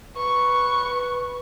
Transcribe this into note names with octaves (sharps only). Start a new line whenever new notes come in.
B4 C#6